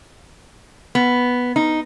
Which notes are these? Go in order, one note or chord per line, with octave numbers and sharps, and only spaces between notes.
B3
D#4